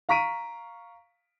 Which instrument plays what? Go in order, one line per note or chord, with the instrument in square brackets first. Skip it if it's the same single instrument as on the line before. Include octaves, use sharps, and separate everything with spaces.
[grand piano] F5 A#5 C#6 B6 D7 D#7